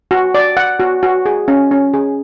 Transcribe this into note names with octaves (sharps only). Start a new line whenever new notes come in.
F#4
D5
F#5
F#4
F#4
G#4
C#4
C#4
G#4